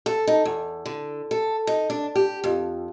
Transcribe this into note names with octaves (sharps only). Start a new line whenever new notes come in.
A4
D#4
E2
D3
A4
D#4
D4
G4
F2